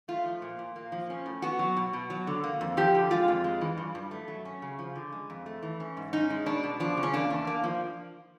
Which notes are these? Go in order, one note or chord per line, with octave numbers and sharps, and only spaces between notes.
A3 F4
F3
A#2
A#2
A#3
F3
C#4
A2
B3 F#4
F#3
B2
B2
F#3
D3
A#3
F2
F3 G4
D3
G#3 F4
F2
G#3
E3
G2
G2
A3
F#3
C#4
C#3
F3
D3
G#3
F2
A3
E3
C#4
G#2
C#4 D#4
G#3
B2 D4
B2
F3 D4
C#3
C#4
A#3 D4
E2
A#3
F3